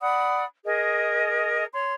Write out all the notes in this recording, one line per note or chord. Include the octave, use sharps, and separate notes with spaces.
D5 F#5 B5 D#6
G#4 A#4 D#5
C#5 C6